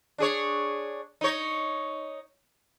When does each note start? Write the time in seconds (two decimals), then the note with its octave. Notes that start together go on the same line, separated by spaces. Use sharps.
0.18 D4 G#4 C#5
1.21 D#4 C#5